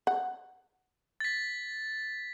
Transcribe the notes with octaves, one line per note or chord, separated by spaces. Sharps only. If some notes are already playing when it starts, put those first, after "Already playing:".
F#5
A6 B6